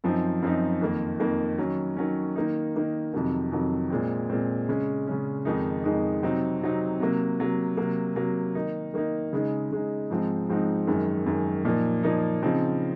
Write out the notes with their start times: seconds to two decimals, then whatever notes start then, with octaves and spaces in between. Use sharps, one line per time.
0.04 F#2 F3 C4 D#4
0.42 F#2 F3 C4 D#4
0.81 F2 D#3 A#3
1.20 F2 D#3 A#3
1.58 D#3 F#3 C#4
1.97 D#3 F#3 C#4
2.36 D#3 A#3 D#4
2.75 D#3 A#3 D#4
3.13 F2 C3 D#3 F#3
3.52 F2 C3 D#3 F#3
3.90 A#2 G#3 C4
4.30 A#2 G#3 C4
4.68 C#3 G#3 C#4
5.07 C#3 G#3 C#4
5.45 F2 D#3 G#3 D#4
5.84 F2 D#3 G#3 D#4
6.23 C3 F#3 C4 D#4
6.61 C3 F#3 C4 D#4
7.00 C3 F#3 A#3
7.39 C3 F#3 A#3
7.77 C3 F#3 A#3
8.16 C3 F#3 A#3
8.55 D#3 A#3 D#4
8.94 D#3 A#3 D#4
9.33 C#3 G#3 D#4
9.71 C#3 G#3 D#4
10.10 G#2 F3 G#3 C4 D#4
10.49 G#2 F3 G#3 C4 D#4
10.87 F#2 D#3 G#3
11.26 F#2 D#3 G#3
11.65 A#2 F3 A#3 D#4
12.03 A#2 F3 A#3 D#4
12.43 C#3 F3 C4 D#4